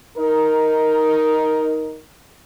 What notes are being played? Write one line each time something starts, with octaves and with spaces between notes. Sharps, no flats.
D#4 A#4